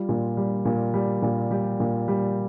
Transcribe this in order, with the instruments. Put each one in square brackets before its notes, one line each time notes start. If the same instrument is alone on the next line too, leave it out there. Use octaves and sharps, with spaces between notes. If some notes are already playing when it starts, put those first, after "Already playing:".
Already playing: [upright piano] G3 F4
A#2
G3
A#2
G3
A#2
G3 G4
A#2
G3